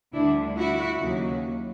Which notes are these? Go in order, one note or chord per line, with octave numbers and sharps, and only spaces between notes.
D2 D3 G3 D4 E4
E4 F#4
D#2 C#3 F#3